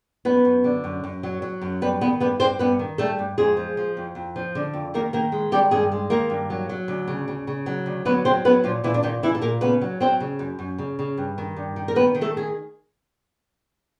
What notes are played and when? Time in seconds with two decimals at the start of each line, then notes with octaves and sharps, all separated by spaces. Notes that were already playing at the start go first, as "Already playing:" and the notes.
0.25 F#2 B3 B4
0.45 F#2
0.64 D3
0.84 F#2
1.04 F#2
1.23 F#3
1.42 F#3
1.61 F#2
1.81 G3 B3 B4
2.01 D#3 B3 B4
2.20 G2 B3 B4
2.39 G2 C4 C5
2.59 G2 B3 B4
2.79 D#3
2.98 G3 A3 A4
3.19 G2
3.38 F2 G#3 G#4
3.57 F3
3.77 F3
3.97 F2
4.15 F2
4.36 F3
4.55 D3
4.74 F2
4.94 D#3 A#3 A#4
5.13 D#3 A#3 A#4
5.32 G#3
5.51 D#3 G3 G4
5.71 G2 G#3 G#4
5.92 G#3
6.10 D#3 A#3 A#4
6.30 G2
6.50 F#3
6.69 F#3
6.88 D2
7.08 C#3
7.28 C#3
7.47 C#3
7.66 F#3
7.86 D2
8.05 F#3 B3 B4
8.25 F#3 C4 C5
8.45 F#3 B3 B4
8.64 A#2 F3 F4
8.84 A#2 E3 E4
8.94 D4
9.03 A#2 D#3 D#4
9.23 A#2 E3 E4
9.35 A4
9.42 A#2 A#3 A#4
9.61 C#3 B3 B4
9.81 F#3
10.00 F#3 C4 C5
10.20 C#3
10.39 F#2
10.59 F#2
10.78 C#3
10.99 C#3
11.17 G2
11.38 D#3
11.56 G2
11.76 D#3
11.88 A#4
11.95 D#3 B3 B4
12.15 D#3
12.21 A3 A4
12.37 G#4